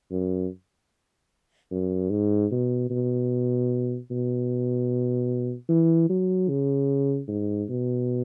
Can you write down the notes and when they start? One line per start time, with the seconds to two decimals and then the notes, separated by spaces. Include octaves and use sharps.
0.11 F#2
1.71 F#2
2.10 G#2
2.51 B2
2.90 B2
4.10 B2
5.69 E3
6.10 F#3
6.49 C#3
7.28 G#2
7.69 B2